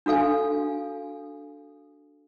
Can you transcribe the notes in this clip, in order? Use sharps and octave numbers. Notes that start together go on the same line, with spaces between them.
D4 F#4 A4 F5 G#5